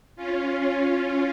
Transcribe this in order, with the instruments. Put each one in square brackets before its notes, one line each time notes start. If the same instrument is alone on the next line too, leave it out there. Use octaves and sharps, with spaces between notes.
[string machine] C#4 F4